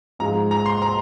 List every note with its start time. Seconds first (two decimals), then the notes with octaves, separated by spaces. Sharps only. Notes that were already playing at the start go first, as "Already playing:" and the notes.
0.19 G#2 F3 G#3 A#5
0.51 A#5
0.66 C6
0.82 A#5